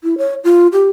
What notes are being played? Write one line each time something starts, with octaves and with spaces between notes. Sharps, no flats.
E4
C#5
F4
G4